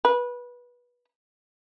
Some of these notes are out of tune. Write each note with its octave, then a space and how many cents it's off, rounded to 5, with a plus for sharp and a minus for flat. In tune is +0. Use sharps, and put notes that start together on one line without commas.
B4 -20